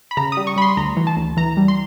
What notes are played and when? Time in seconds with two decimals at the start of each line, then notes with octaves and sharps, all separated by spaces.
0.11 B5
0.17 C#3 A#5
0.32 G3 D#6
0.47 C#6
0.56 G3 B5
0.62 C6
0.77 D2 A#5
0.97 E3
1.07 A5
1.17 D2
1.37 E3 A#5
1.57 G3
1.68 C6